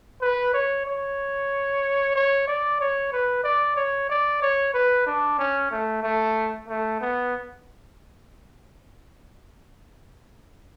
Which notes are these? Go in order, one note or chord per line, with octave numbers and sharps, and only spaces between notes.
B4
C#5
C#5
C#5
D5
C#5
B4
D5
C#5
D5
C#5
B4
D4
C#4
A3
A3
A3
B3